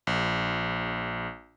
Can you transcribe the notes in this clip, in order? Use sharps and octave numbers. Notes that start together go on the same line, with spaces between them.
A#1